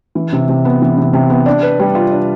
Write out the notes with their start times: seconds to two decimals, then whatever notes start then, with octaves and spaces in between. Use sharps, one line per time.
0.15 E3
0.33 C3
0.49 C3
0.65 B3
0.82 E3
0.97 C3
1.13 C3
1.30 B3
1.46 D4
1.63 B4
1.79 G3
1.95 F4
2.12 D4